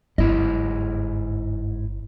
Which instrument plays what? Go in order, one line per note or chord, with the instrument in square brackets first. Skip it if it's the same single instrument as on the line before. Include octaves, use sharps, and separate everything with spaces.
[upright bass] G1 [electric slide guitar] G#2 E4 D#5